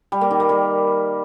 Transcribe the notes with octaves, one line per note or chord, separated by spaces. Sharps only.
G3
A#3
D#3
A#3
G3